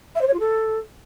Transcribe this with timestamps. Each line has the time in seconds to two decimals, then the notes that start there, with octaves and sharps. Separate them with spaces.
0.15 E5
0.21 C5
0.27 C#5
0.33 F4
0.39 A4